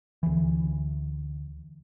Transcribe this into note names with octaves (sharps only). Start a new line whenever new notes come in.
D2 E3